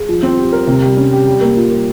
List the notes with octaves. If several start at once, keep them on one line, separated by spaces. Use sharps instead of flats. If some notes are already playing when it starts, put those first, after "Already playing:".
Already playing: G#4
F3
C4
G4
A#4
C3
G3
C#4
G4
G3
A#3
F4
A#4